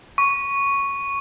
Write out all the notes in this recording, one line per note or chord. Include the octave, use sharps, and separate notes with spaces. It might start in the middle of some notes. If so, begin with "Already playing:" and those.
C#6